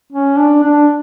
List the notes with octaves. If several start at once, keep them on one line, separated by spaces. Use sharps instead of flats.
C#4
D4
D4